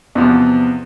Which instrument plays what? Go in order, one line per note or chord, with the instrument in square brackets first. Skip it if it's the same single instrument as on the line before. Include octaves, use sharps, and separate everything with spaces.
[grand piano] E2 C3 F3 B3